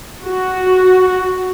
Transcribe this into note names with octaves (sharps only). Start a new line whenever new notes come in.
F#4